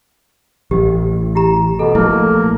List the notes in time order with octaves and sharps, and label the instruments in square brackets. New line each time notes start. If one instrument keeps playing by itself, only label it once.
[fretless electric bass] A1 [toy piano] G4
[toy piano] E4 G4 A#5
[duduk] B2 [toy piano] A4
[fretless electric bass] A#1 A3 [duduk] A#3 [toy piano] E4